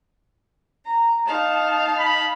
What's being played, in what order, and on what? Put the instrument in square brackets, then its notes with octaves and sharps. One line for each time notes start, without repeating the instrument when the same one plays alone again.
[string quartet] A#5
D#4 F5 A5
[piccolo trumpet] B5